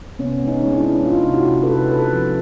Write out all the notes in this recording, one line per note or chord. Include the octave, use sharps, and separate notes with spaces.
C3 B3 C#4
G#3
C#4 D#4
G#3
D4 E4
G#3
G#3 D#4 F4
C3
E4 F#4
C3
A4 B4
C3
C3 A4 B4
F3